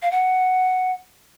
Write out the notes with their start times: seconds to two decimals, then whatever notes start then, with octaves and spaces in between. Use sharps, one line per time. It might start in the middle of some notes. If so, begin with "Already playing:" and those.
0.02 F5
0.11 F#5